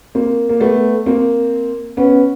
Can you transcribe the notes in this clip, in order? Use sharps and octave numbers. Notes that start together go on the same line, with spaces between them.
A#3 C4
A#3
A3 B3
A#3 C4
B3 C#4